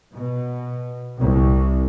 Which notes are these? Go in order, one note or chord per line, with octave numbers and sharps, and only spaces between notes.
B2
C2